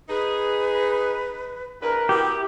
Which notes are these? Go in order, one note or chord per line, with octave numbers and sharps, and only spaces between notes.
D#4 G#4 B4
E2 D4 A#4 B4
B2 B3 E4 G4 G5